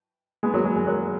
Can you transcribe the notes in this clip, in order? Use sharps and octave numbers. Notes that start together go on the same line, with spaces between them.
G#3 B3
F#3 A#3
G#3
G#3
F#3 A#3